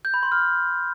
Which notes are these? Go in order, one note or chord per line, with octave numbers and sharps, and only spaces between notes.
G6
B5
C6
F6